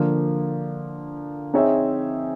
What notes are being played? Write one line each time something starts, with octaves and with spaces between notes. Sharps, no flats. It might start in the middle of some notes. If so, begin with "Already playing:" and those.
Already playing: D3 F3 A#3
C4 D#4 G#4 C#5 E5